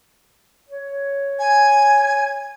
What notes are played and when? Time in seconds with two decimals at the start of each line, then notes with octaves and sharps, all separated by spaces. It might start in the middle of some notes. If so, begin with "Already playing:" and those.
0.69 C#5
1.39 G#5